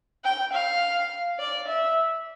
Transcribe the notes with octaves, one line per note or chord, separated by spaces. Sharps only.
G5
F5
D5
E5